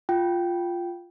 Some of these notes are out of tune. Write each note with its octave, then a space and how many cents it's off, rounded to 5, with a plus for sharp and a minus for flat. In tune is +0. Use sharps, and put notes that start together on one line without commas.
F4 +0 G5 -10